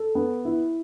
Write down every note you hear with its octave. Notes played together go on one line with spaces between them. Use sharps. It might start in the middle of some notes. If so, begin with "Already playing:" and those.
Already playing: A4
B3
E4